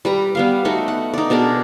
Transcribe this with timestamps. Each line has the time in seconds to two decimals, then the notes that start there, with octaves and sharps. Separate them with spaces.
0.05 G3 B4 A#5
0.35 G3 B3 F5
0.65 A3 D#4 F#4
0.88 F#5
1.13 D#4 D5
1.30 B2 D4 G#4 A#4